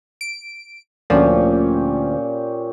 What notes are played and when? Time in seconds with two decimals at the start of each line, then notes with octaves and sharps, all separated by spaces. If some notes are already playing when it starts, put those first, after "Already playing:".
0.21 D7
1.10 D2 A#2 F3 C#4 G4